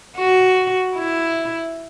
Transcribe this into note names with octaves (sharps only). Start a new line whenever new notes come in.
F#4
E4